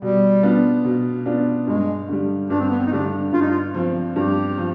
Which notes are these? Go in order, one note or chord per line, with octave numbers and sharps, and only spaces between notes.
B2 G3
B3 D4 F4
B2
B3 D4 F4
G2 G#3
D3 G3
G2 D4
C4
B3
C4
D#4
D3 G3 D4
G2 F4
D#4
F4
F3 C4
G2 G4
F3